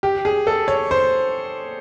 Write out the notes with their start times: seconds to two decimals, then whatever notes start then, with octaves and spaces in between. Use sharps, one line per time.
0.03 G4
0.25 G#4
0.47 A4
0.68 C#5
0.91 C5